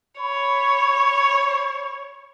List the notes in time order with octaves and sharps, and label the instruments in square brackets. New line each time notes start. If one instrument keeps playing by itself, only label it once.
[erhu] C#5 [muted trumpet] B5